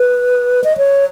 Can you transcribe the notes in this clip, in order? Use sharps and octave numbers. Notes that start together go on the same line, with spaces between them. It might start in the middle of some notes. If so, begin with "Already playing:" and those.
Already playing: B4
D#5
C#5